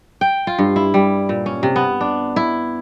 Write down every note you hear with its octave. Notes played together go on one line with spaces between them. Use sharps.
G5
F4
G2
E4
G3
A#2
C#4
C3
B3
D4
E4